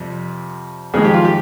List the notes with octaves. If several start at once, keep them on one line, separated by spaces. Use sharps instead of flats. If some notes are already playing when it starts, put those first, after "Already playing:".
Already playing: F2 C3 G3
F2 D#3 G#3 G#4
G4
F4
G4